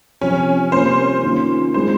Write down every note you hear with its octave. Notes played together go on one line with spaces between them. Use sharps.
C3 F3 C4 C#4
C3 G3 A#3 F4 C5
D#3 A#3 C#4 F4
D#3 G#3 C4 C5